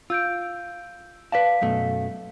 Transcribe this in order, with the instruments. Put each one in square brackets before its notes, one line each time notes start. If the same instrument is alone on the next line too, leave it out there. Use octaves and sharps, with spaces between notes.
[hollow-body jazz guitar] F4 [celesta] E6 G6 D7
[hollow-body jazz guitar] B4 D5 A5 [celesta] F5 B6
[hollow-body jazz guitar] F#2 B2 A3